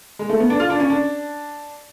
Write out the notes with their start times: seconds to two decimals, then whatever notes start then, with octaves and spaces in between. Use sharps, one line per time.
0.19 G#3
0.29 A3
0.40 B3
0.50 D4
0.60 F4
0.70 D4
0.80 C#4
0.90 D4